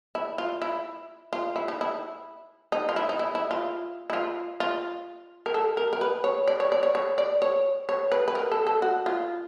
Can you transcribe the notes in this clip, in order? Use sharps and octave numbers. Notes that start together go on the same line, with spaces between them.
E4
F4
E4
F4
E4
D#4
E4
D#4
F4
E4
D#4
E4
E4
F4
E4
F4
F4
A#4
A4
A#4
A#4
B4
C#5
D5
C#5
D5
C#5
C#5
D5
C#5
C#5
B4
B4
A#4
A4
A4
F#4
F4